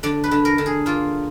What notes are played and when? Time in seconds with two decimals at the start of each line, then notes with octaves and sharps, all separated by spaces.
0.03 D3 D5
0.24 B4
0.31 D3
0.45 A#4
0.58 D3
0.66 G#4
0.86 A#3 F4